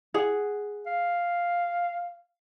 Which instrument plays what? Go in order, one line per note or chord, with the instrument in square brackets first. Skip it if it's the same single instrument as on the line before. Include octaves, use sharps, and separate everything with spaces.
[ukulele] G#4 F#5
[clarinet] F5